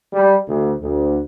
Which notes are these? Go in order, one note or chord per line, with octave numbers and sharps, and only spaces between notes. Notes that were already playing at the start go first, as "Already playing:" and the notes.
G3
D2
D2